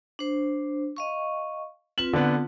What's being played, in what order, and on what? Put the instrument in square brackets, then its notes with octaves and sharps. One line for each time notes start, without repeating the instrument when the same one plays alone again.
[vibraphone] D4 C5
D#5 F5 C#6
[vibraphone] C4 F4 B4 [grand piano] F#7
[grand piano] D3 B3